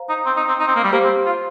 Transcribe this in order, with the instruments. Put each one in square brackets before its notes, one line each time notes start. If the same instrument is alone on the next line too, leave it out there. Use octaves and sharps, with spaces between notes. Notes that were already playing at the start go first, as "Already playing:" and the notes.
Already playing: [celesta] C5 F5 A#5
[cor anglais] D#4
C4
D#4
C4
D#4
C4
A#3
G3
[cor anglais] A#3 [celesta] G4 C5 F5
[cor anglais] C4
F4